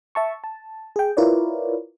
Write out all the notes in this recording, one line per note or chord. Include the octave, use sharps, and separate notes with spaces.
E5 A5 C#6
A5
G#4 G5
E4 F4 A#4 B4 C#5 D5